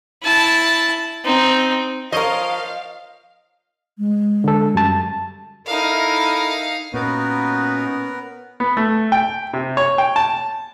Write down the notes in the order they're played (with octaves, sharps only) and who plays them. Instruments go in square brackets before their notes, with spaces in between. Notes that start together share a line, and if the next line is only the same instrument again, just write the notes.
[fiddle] E4 A5
C4 D#4
[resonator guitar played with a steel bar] F3 A#4 [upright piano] C5 C#5 C#6 [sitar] D#5 [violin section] F5
[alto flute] G#3
[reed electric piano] D3 A4
F#2 G3 A5
[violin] D#4 F5 [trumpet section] E4 A4 A#4
[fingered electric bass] A#2 [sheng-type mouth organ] B3 A#4 [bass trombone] C#4 [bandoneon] D#4 F#4 B4
[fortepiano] B3
A3
G5
C3
C#5
G5
A5